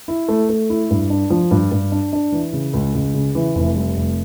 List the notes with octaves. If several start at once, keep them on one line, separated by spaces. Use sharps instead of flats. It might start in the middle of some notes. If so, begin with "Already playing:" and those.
E4
A3
A3
E4
G2
D4
F3
G2
G2
D4
D4
E3
C#3
C#2
C#2
C#3
E3
F1
G3
F1